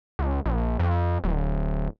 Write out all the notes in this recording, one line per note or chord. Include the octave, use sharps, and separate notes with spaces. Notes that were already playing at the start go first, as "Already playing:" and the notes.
C#2
A#1
F2
D1